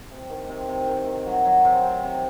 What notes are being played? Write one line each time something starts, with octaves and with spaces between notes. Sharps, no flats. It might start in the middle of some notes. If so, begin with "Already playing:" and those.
C3
D#3
C3
C3
D#3
D#3
F#3
F#3
C3
C3
C3